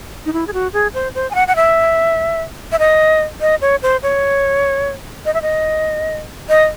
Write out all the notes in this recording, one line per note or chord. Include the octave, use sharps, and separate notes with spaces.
D#4
E4
G#4
F#4
G#4
C5
C5
G#5
F#5
F#5
E5
E5
D#5
D#5
C#5
C5
C#5
D#5
E5
D#5
D#5